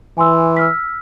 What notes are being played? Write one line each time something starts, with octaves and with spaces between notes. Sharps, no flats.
E3 G#5 C6 E6
E6 F6 B6